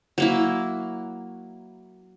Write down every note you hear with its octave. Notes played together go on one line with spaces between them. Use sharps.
F#3 A#3 E4